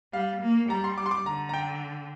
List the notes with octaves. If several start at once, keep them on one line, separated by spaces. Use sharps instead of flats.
G3 F5
A#3
G3 A#5
C6
D6
C6
D6
D3 A#5
A#5
G5